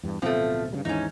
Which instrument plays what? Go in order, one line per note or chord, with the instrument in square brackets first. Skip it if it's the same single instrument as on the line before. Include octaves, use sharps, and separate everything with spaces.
[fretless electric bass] E2 G2
[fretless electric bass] D1 B2 C4 [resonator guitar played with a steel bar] F3 A3
[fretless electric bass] G2 C#3 G3
[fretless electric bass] D#2 G#2 E3 [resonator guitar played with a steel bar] C#4 D#4